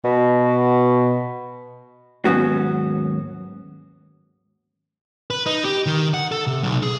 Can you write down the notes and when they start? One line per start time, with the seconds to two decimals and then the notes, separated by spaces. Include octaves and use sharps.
0.05 B2
2.25 D#2 G#2 F#3 B3 C#4 F#4
5.30 B4
5.46 D#4
5.65 G4
5.86 D#3
6.14 F#5
6.32 A4
6.47 C3
6.63 B1
6.83 G#4